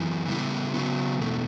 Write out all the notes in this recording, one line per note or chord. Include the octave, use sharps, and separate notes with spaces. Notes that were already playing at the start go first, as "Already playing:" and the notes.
Already playing: F#2 E3
C#3 G3 B3 E4
C#3 F#3 B3
E2 B2 A3